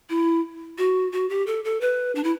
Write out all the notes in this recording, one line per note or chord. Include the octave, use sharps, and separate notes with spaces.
E4
F#4
F#4
G4
A4
A4
B4
D4
E4